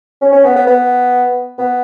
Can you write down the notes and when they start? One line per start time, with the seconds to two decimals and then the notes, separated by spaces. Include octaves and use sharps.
0.22 C#4
0.33 C#4
0.45 B3
0.56 B3
0.67 B3
1.59 B3